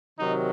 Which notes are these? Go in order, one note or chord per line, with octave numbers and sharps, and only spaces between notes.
C3 D#3 F#3 D#4